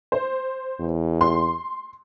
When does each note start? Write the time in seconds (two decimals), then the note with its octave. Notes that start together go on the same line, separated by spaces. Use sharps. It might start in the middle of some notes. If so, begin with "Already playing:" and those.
0.12 C5
0.80 E2
1.21 C6